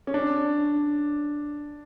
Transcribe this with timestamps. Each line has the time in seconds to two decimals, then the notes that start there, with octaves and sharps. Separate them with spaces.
0.07 C#4
0.14 D4